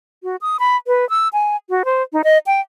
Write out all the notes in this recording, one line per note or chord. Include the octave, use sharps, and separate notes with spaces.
F#4
D#6
B5
B4
E6
G#5
F#4
C5
D#4
D#5
G5